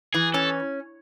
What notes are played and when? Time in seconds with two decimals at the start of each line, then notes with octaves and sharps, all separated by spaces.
0.14 E3 G#4
0.34 C#4 A4